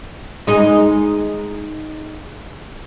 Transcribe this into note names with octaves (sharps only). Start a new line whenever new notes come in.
G#3 D#4